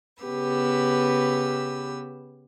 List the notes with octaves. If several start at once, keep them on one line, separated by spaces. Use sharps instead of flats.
C#3 B3 G4 B4 E6